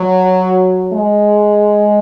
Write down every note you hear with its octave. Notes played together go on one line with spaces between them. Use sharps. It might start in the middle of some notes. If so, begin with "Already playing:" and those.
Already playing: F#3
G#3